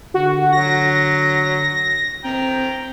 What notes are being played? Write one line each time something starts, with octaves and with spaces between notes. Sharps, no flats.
D3 F#4
F#3 A#6
C4 G5 A#5